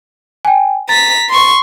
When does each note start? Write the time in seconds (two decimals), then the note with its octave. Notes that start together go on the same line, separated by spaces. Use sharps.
0.45 G5 G#5
0.89 A#5 A6 B6
1.30 C6 C#6